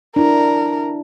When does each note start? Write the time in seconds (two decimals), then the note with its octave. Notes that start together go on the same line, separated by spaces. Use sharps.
0.16 D4 E4 A#4